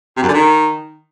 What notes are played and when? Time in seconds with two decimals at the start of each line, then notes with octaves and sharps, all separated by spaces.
0.17 C3
0.22 F#2
0.28 D3
0.34 D#3